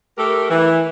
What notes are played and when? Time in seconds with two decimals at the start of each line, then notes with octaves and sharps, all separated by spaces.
0.18 A3 G4 A4 A#4
0.50 E3